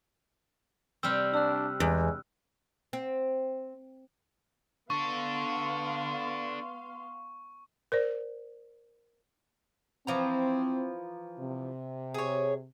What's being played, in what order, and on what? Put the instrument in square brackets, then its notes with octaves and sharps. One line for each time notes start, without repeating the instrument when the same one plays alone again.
[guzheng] C3 G3 C4 [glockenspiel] E6 F6
[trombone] D4 [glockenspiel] E6 F#6
[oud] E2 [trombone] G#3
[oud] C4
[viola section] B3 F5 C6 [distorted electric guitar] D4 A4 [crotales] C#6
[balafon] A#4 C5 D5
[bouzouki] E3 F3 A#5 [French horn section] C4
[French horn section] C3
[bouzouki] G#4 C#5